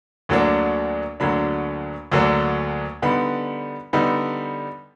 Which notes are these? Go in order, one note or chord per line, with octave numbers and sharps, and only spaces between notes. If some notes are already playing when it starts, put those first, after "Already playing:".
D2 D3 F#3 A#3 D4
D2 D3 F#3 A#3 D4 B5
D2 D3 F#3 A#3 D4
D3 G3 B3 D#4 B5
D3 G3 B3 D#4